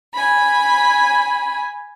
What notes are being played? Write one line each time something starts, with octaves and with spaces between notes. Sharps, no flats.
G#5 B5